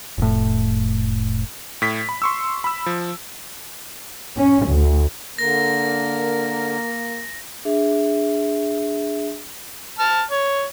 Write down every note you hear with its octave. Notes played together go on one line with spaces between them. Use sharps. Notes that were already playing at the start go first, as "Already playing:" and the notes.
F1 A2
A2 B6
B5
C6 C#6 E6
B5 E6
F3
C#4
D2
D3 A#3 A#4 A#6
D4 G#4 E5
A5 F6
C#5